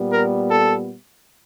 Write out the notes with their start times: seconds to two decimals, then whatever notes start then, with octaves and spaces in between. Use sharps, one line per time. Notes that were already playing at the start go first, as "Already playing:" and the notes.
Already playing: A#2 G3 B3
0.11 A#4
0.50 A4